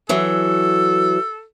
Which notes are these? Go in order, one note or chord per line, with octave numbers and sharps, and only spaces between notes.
E3 F#3 A4